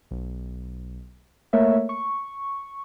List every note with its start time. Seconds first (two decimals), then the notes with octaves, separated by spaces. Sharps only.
0.11 B1
1.53 A3 A#3 A#4 C#5 E5
1.89 C#6